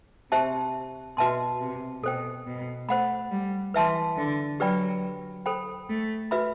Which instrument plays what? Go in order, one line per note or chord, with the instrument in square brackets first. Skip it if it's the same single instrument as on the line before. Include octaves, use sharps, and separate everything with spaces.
[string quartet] C3 [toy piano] G4 C5 E5 A5
[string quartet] B2 [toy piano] F#4 B4 E5 A5 C6
[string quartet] C3
[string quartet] B2 [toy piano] A4 C5 G5
[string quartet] B2
[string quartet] A3 [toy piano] C5 F#5 B5
[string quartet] G3
[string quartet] E3 [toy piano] B4 E5 A5 C6
[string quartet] D3
[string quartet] F#3 [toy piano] G4 B4 D5 G5 B5
[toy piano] A4 C5 G5 B5
[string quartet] A3
[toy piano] F#4 B4 E5 B5